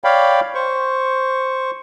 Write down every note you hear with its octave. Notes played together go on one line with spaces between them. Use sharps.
C#5 D5 F5 G5 B5
C5 C#6